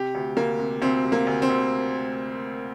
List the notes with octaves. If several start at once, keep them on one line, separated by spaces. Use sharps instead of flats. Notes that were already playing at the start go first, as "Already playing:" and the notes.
Already playing: C3 G4
D2
D2 A#3
C3
D2 C4
C3
A#3
D2
C4
D2